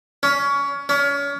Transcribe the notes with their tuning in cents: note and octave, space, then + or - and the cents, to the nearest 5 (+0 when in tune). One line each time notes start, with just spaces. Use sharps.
C#4 +20
C#4 +30